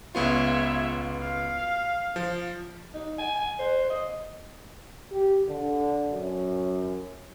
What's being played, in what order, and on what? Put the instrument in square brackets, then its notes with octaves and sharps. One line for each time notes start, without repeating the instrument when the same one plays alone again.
[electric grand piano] C#2 B3 F4 [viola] C#5 E5
[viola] F5
[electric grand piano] F3
[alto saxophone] D#4
G#5
G#5
C5
D#5
[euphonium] G4
D3
F#2